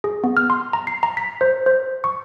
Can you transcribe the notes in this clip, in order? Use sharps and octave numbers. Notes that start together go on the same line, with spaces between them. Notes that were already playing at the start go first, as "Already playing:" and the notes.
G#4
B3
F6
C6
A#5
C7
A#5
B6
C5
C5
C#6